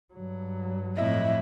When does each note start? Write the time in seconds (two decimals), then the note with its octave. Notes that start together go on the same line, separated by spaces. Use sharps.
0.13 G2 F#3
0.97 F2 A2 E4 D#5 E5